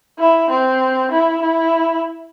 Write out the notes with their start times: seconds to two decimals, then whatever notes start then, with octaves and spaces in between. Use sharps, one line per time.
0.19 E4
0.49 C4
1.11 E4
1.42 E4